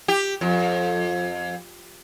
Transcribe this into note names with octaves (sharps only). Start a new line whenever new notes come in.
G4
F2